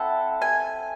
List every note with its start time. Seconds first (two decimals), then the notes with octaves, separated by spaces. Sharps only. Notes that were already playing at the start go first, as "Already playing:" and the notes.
Already playing: C4 E4 A4 F#5
0.42 G#5